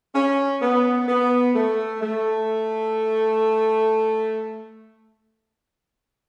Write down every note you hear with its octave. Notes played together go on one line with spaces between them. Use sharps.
C#4
B3
B3
A3
A3